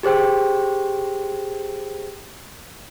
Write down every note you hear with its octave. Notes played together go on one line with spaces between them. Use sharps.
G4 G#4 C5 G5